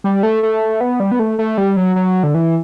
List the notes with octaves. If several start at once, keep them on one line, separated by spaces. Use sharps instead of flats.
G3
A3
A3
B3
G3
B3
A3
A3
G3
F#3
F#3
D3
E3